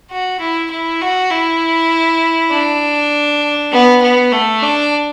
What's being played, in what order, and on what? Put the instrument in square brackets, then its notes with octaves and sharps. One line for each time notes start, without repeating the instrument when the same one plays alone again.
[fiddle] F#4
E4
E4
F#4
E4
D4
B3
B3
A3
D4